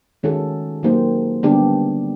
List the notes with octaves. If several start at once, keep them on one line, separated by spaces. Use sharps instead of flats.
D#3 G#3 C#4 F#4 A4
F#3 A#3 D#4 G4 C5
D3 G3 B3 D4 G4